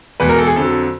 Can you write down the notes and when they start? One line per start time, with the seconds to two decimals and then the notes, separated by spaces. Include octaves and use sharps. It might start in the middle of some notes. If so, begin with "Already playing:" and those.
0.20 E2 B2 G#3 B4
0.29 A#4
0.38 A4
0.47 G#4
0.56 F2 D3 F#3 A4